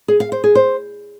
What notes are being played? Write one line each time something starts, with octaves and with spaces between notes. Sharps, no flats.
G#4
F5
C5
G#4
C5